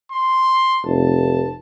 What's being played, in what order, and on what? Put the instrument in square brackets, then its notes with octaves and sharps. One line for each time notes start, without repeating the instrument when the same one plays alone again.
[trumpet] C6
[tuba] F1 [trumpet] A5